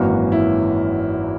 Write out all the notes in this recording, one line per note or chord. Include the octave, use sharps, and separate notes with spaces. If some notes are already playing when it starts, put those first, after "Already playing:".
Already playing: G#1 F#2 E3 A#3 C#4 F#4
E4